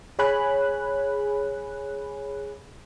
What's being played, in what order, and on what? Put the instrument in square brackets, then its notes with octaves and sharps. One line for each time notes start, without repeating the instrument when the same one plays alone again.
[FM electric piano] G#4 C#5 G#5 B5 F#6